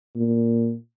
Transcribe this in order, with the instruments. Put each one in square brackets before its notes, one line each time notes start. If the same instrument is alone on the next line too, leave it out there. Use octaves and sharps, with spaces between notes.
[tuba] A#2